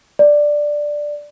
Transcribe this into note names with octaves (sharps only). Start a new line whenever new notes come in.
D5